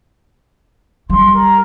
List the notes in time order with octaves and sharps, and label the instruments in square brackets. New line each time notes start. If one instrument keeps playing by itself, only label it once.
[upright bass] G3 [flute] C6
[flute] A#4